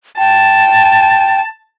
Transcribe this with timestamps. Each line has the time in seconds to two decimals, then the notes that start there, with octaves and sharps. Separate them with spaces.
0.18 G5 A5